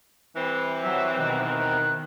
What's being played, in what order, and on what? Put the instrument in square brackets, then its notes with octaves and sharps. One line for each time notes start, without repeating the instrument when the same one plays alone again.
[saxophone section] E3 G3 C4
[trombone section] F#3 [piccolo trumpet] E5
[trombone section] B2 D#3 [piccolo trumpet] F#6